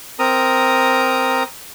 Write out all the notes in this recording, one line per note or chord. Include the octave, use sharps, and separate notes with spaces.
C4 A#4 A#5 D#6